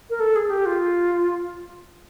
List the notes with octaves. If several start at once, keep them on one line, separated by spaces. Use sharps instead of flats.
A#4
A4
G#4
G4
F4